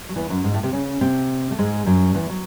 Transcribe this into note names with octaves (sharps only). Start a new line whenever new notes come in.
F#3
E2 E3
F#2 F#3
G#2 G#3
A2 A3
C3 C4
C#3 C#4
C3 C4
A3
G#2 G#3
F#2 F#3
E2 E3
F#3